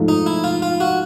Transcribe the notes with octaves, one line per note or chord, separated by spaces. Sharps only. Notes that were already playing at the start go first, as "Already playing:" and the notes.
Already playing: G#2 F3 A3
D#4
E4
F4
F4
F#4